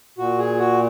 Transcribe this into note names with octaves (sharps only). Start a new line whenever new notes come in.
A#2 F#4
G#4
F#4